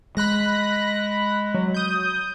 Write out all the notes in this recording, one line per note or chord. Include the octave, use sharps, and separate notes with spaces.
G#3 B5 F#6 A#6
F#3
D#6 G6